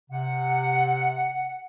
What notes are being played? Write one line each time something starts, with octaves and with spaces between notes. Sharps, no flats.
C3 F#5